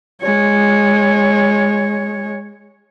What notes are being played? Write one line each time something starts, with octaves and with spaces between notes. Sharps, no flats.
G#3 C#5